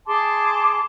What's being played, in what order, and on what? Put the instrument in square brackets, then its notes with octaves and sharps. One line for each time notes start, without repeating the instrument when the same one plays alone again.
[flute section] G#4 A5 C6 D6